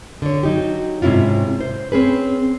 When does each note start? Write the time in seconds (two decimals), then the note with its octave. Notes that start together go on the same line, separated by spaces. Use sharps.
0.22 D3 C#5
0.43 F#3 D#4 G4
1.02 G#2 C3 C#4 E4 F4
1.61 C5
1.92 C4 C#4 G#4 B4